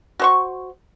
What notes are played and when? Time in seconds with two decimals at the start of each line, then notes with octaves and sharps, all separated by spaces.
0.19 F#4 C5 C#6